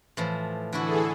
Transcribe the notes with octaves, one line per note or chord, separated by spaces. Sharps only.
A2 E3 F3
D3 E3 E4 F#4 G#4 A4